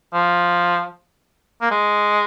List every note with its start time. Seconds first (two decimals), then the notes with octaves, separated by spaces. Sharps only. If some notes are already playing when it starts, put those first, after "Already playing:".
0.13 F3
1.61 A#3
1.71 G#3